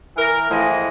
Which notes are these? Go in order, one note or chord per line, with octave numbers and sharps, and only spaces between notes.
E3 A#4
A2 E3 F3 G#3 D#5